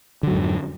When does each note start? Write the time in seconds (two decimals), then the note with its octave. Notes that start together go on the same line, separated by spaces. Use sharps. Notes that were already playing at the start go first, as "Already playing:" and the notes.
0.23 D3
0.27 F#3
0.31 G#2
0.35 F2